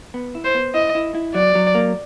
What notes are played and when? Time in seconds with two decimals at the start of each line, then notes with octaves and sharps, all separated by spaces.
0.14 B3
0.35 E4
0.45 C5
0.54 B3
0.74 E4 D#5
0.95 E4
1.15 E4
1.34 F#3 D5
1.55 F#3
1.75 A#3